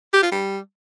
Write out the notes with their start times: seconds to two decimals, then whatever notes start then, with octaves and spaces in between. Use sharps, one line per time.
0.14 G4
0.23 F4
0.32 G3